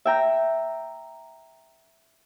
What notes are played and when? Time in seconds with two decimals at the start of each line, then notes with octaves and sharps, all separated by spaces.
0.05 E5 G5 A#5